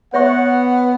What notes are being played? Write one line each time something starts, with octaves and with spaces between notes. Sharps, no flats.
B3 C#5 E5 F#5 C#6